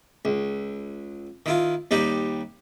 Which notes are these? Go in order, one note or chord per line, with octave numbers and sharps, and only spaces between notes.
C#2
D#3 E4 F4
D#2 G3 D#4 G4